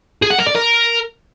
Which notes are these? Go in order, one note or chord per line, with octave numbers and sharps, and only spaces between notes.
G#4
F#5
A#4
D5
A#4